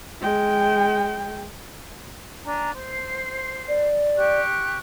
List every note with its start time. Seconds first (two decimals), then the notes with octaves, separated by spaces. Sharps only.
0.21 G#3 G5
2.45 D4 G#5 A#5
2.75 C5 C6
3.68 D5
4.17 G4 C#6 F#6